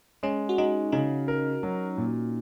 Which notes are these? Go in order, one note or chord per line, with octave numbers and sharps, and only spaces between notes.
G#3 C#4
F#4
G#3 D#4
C#3 D#4
A#4
F#3
A#2